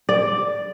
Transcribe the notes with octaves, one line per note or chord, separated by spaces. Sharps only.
D5